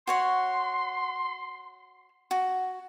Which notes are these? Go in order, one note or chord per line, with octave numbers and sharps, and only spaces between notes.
F#4 C#5 F#5 C6
F#4